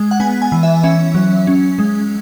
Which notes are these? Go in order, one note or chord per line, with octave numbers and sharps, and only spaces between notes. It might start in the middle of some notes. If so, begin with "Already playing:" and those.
Already playing: G#3
F#5
B3 G#5
G#5
E3
E5
C#4 E5
F#3
C#4
G#3